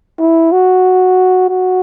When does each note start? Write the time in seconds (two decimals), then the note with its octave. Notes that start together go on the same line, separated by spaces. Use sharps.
0.20 E4
0.52 F#4
1.49 F#4